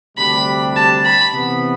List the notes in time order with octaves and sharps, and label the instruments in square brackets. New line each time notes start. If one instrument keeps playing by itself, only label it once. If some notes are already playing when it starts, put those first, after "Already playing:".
[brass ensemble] D2 C3 G3 D4 [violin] B5
[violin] A5
B5
[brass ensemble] C3 E3 B3